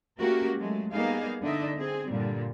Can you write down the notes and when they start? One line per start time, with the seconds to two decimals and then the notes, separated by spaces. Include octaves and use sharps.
0.18 A3 A#3 C#4 F#4 G4 A#4
0.56 F#3 G#3 A3
0.91 G3 A#3 B3 D#4 G#4 F5
1.42 D3 D4 D#4 D#5 E5
1.76 C4 G#4
2.10 G2 A#2 D3 G3